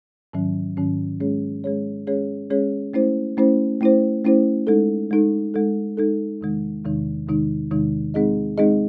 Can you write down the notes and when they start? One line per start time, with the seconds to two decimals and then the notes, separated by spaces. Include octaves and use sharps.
0.33 G#2 D#3 F#3 C#4
0.77 G#2 D#3 F#3 C#4
1.20 G#3 C#4 G#4 C#5
1.64 G#3 C#4 G#4 C#5
2.07 G#3 C#4 G#4 C#5
2.50 G#3 C#4 G#4 C#5
2.94 A3 C#4 E4 C5
3.37 A3 C#4 E4 C5
3.81 A3 C#4 E4 C5
4.24 A3 C#4 E4 C5
4.67 G#3 D#4 A4
5.11 G#3 D#4 A4
5.54 G#3 D#4 A4
5.97 G#3 D#4 A4
6.41 E2 C3 D#3 G#3 D#4
6.84 E2 C3 D#3 G#3 D#4
7.28 E2 C3 D#3 G#3 D#4
7.71 E2 C3 D#3 G#3 D#4
8.14 G#3 C4 D#4 G#4 D#5
8.58 G#3 C4 D#4 G#4 D#5